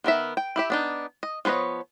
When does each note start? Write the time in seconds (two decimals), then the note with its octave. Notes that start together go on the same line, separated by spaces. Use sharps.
0.04 D#3 B3 A#4 E5
0.37 G5
0.56 E4 G4 E5
0.70 B3 D4 D#4
1.23 D#5
1.45 F3 B3 B4 C#5 D#5